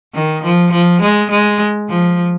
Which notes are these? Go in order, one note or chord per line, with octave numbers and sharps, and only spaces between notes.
D#3
F3
F3
G#3
G#3
F3